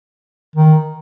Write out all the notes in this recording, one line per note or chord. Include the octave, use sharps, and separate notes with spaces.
D#3